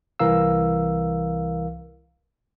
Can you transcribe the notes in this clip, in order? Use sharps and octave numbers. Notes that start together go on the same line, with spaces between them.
C2 E3 A#4 F5 E6